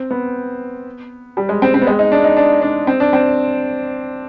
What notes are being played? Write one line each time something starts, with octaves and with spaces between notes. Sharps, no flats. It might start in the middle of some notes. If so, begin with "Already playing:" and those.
Already playing: C4
B3
G3
G#3
C4
C4
B3
G#3
D#4
D4
D#4
D4
D4
C4
D4
C4